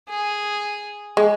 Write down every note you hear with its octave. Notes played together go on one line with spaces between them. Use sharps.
G#4
G#3